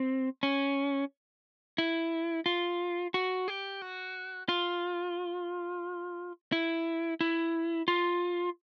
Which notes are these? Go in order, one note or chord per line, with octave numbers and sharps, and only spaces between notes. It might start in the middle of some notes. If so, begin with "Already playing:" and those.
Already playing: C4
C#4
E4
F4
F#4
G4
F#4
F4
E4
E4
F4